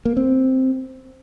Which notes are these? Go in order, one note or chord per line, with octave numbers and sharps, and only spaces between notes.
A#3
C4